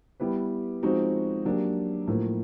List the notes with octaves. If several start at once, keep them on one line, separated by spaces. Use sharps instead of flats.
G3 B3 E4 G4 B4
F3 G#3 C4 D#4 F#4
F#3 A#3 D4 G4
A2 F3 A#3